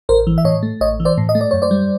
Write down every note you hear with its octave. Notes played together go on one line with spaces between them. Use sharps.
A1 A#4 C5
E3
E5
A2 C#5 D#5
A3
A1 C#5 D#5
E3
C5 D5
A2
D#5
A3
D5
F#2 C#5
C5 D5
G3